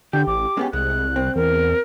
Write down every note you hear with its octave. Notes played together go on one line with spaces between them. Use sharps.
D3 G4 G6
A1 D6
G#3 B3 C#4 G4
C2 G#3 F#6
C4
E2 A#4